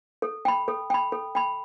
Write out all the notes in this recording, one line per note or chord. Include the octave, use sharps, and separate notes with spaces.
A4
G5 B5
A4
G5 B5
A4
G5 B5